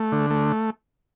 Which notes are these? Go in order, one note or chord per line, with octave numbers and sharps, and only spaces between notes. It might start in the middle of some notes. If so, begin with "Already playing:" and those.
Already playing: A3
D3
A3